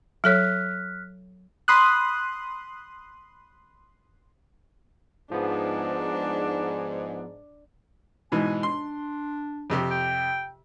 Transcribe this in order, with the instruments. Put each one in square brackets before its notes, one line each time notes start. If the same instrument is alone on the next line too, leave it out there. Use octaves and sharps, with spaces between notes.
[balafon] F#3 A4 C#5 [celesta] F6 F#6 B6
[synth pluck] B5 C6 D#6 F#6
[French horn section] G#2 [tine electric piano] F3 B3 [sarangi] D4
[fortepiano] G#2 B2 E3 [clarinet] G#5
[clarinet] D4 [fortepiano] C6
[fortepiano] F2 C3 G4
[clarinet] G5